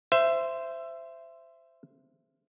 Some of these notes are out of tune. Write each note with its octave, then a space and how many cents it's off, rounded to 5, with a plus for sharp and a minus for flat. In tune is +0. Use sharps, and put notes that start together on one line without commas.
C5 -10 E5 +20